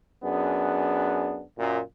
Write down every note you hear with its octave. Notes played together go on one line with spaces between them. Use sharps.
F#2 B3 D4 G#4
F#2 A#2